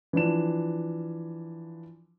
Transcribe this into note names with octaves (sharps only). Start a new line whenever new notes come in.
E3 F3 D4 E7